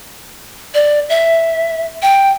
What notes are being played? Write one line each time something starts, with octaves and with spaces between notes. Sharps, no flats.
D5
E5
G5